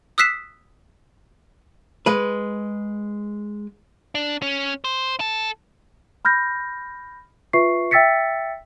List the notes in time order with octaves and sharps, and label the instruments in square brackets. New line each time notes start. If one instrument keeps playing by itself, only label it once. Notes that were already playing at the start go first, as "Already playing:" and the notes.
[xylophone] D#6 E6 F#6 B6 C7 E7
[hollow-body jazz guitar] G#3 B4
[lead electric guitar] D4
C#4
C5
A4
[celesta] B5 F6 G6 A#6
F4 B4 E5 C#6 C7
E5 G5 E6 A6 B6 C#7